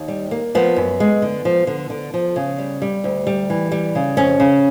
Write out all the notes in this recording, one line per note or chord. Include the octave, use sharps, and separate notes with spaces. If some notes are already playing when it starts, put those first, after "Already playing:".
Already playing: D#2
G3
A#3
F3 B3
F#2
G#3
D3
F3
D3
D3
F3
C#3
G3
G3
D2
G3
E3
G3
C#3
F2 C#4
C#3